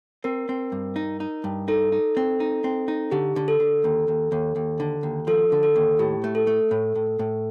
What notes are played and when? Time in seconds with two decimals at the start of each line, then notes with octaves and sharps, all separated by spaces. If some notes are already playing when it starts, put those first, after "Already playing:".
0.24 C4 A#4
0.49 C4
0.72 G2
0.96 D#4
1.20 D#4
1.44 G2
1.68 D#4 A4
1.92 D#4
2.17 C4
2.40 D#4
2.64 C4
2.88 D#4
3.11 D3 G4
3.36 D3
3.48 A4
3.60 D3
3.84 D#2
4.08 D#2
4.32 D#2
4.56 D#2
4.80 D3
5.03 D#2
5.27 F3 A4
5.52 D3
5.63 A4
5.76 D#2
5.99 A2 G4
6.24 A3
6.35 A4
6.47 A3
6.71 A2
6.95 A2
7.19 A2